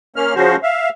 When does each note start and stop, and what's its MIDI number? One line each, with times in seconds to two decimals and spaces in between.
0.16 0.34 58
0.16 0.34 61
0.16 0.34 89
0.35 0.56 49
0.35 0.56 53
0.35 0.56 61
0.35 0.56 66
0.35 0.56 72
0.63 0.89 76
0.63 0.89 77